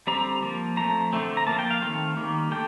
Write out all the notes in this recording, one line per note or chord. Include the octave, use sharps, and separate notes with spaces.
D3 G3 C4 A#5
F3 A#3
F3 A3 C4 A#5
D3 A3 C4
A#5
F3 A#3 A5
G5
F5
D#3 A3 C4
D#3 G3 A#3
D3 A3 G5